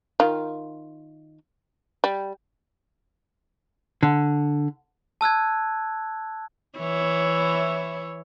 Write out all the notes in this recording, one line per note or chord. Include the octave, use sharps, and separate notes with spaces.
D#3 F4
G3
D3
A5 E6 F#6 G#6
E3 E4 C#5